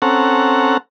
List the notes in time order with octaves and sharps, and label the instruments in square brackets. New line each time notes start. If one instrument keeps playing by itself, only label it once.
[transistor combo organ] C4 C#4 A4 F#5 A#5